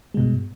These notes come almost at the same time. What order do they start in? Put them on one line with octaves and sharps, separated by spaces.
G#3 B2 G2